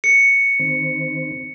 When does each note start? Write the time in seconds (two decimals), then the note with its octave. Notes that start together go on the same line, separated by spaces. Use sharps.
0.04 C#7
0.59 D#3 C4